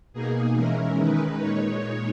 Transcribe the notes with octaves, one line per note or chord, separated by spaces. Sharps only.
B2 A#3 D#4 G#4
E3 G#3 C#4 E4 A#4
D#3 G#3 D#4 B4
A#2 G#3 D#4 C#5